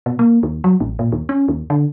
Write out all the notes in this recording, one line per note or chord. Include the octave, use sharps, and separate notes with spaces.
B2
A#3
D#2
F#3
A1
A#2
D#2
C#4
D#2
D3